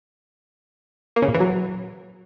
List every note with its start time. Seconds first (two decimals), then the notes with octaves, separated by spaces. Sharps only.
1.16 A#3
1.22 C#3
1.28 A#2
1.34 E3
1.40 F#3